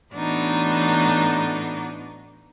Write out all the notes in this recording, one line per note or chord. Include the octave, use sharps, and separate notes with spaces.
A2 E3 B3 D4 D#4 F#4